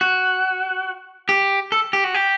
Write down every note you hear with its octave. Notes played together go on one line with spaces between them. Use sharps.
F#4
G4
A4
G4
F#4
G4